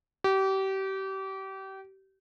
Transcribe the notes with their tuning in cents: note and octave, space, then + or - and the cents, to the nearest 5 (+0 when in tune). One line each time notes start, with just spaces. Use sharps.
G4 -30